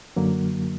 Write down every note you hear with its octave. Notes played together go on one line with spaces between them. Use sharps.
F#2 D3 F#3 A#3